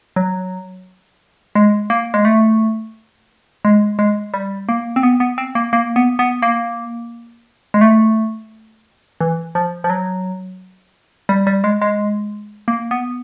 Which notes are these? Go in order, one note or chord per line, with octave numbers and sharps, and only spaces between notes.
F#3
G#3
A#3
G#3
A3
G#3
G#3
G3
A#3
C4
B3
B3
C4
A#3
A#3
B3
B3
A#3
G#3
A3
E3
F3
F3
F#3
G3
G3
G#3
G#3
A#3
B3